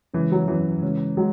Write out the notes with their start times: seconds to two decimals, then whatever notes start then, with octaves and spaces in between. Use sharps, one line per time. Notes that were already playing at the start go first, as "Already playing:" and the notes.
0.14 C#3 E3 G#3 C#4
0.32 F#3
0.48 E3 F#3 C#4 F#4
0.82 C#3 G#3 C#4
1.17 F#3 G#3